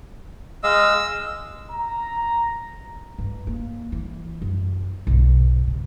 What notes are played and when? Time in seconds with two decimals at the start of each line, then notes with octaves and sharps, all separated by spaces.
0.64 G#3 D#5 F5 E6
1.72 A#5
3.18 G2
3.47 A#3
3.92 E3
4.42 F#2
5.07 B1 G2
5.67 C#3